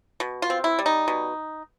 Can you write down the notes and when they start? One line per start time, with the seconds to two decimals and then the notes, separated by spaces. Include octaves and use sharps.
0.20 B2
0.42 F4
0.50 C4
0.64 E4
0.79 G3
0.86 D#4
1.08 B2